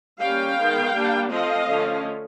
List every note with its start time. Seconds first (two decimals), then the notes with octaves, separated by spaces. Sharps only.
0.19 G3 A#3 C#4 F5 G5
0.56 D#3 G#3 B3
0.93 G3 A#3 D4
1.31 F3 A3 C4 D#5 F5
1.68 D3 F3 A3 C#4